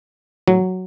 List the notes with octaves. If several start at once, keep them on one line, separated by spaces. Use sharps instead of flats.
A2 F#3